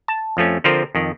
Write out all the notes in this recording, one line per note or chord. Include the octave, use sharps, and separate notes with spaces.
A5
F2 F3 A3 C#4
D3 F3 C4 F4 A#4 C5
F2 D#3